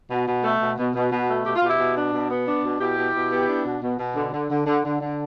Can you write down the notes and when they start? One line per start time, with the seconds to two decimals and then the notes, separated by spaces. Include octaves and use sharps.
0.10 B2
0.27 B2
0.44 A3
0.61 B2
0.78 B2
0.95 B2
1.12 B2
1.29 A3
1.45 B2 G4
1.56 F4
1.63 B2 E4 G4
1.79 B2
1.96 D4
2.13 B2
2.30 B3
2.46 D4
2.64 B2
2.81 B2 E4 G4
2.98 B2
3.14 B2
3.32 B3
3.49 D4
3.65 B2
3.82 B2
3.99 B2
4.16 D3
4.33 D3
4.50 D3
4.66 D3
4.84 D3
5.01 D3